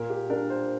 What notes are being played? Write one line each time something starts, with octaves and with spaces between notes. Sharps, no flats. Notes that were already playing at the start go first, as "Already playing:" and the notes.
Already playing: A#2 A#4
G4
D4 A#4
C5